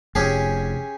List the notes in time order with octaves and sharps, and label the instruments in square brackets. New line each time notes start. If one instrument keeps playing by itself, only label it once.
[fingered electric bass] F1 [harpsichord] C#4 G4 G#4